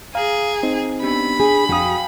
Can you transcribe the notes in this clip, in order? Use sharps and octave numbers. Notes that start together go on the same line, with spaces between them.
G#4 F5 A#5
C4 D#4
B3 D4 G4 B5
D4 G#4 G#5
F2 F#4 F5 G5 G#5 D#6